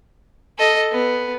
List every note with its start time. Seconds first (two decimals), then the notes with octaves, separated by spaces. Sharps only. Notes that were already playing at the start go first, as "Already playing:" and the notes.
0.58 A4 D#5
0.91 B3